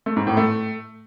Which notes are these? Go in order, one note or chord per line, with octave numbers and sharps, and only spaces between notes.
A3
G#2
A2
A3